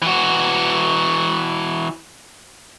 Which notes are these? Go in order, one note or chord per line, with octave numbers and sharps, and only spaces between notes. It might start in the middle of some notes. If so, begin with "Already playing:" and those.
E3 F#4